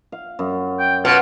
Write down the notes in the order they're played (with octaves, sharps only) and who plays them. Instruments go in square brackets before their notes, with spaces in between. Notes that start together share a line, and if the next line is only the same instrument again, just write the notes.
[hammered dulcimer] F5
F#2
[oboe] G5
[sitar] B2 [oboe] F4 [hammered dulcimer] F#5